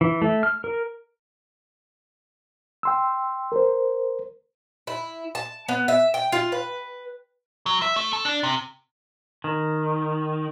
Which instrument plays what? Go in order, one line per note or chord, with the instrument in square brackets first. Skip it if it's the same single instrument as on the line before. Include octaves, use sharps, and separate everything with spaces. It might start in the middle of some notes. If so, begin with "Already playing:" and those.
[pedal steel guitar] E3
A3
F6
A#4
[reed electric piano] G5 C6 E6
A#4 C5
[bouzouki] E4
A5
B3
E5
G5
F4
B4
[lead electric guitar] F#3
E5
A3
A4
D4
C3
[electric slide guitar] D#3